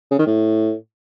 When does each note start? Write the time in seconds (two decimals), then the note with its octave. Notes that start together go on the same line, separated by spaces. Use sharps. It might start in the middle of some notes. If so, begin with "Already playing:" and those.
0.11 C#3
0.19 D#3
0.27 A2